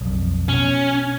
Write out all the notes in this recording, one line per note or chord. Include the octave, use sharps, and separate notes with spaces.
B1 F2
B2 C#4